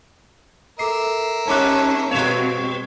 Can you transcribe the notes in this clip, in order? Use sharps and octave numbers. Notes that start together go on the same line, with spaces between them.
A4 A#4 E5 D6 C7
G3 C#4 D#4 A5 D6 F#6
B2 G3 C4 C#5 F5 E7